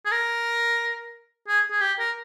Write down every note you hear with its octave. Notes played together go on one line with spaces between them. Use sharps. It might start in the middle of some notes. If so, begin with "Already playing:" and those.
G#4
A#4
G#4
G#4
G4
A#4